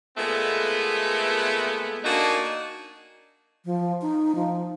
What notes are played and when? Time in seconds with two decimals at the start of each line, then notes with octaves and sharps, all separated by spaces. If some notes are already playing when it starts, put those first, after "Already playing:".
0.18 A#2 G#3 A3 B3
2.05 A#3 D4 D#4 F#4 G#5 A5
3.65 F3
4.01 D#4
4.35 F3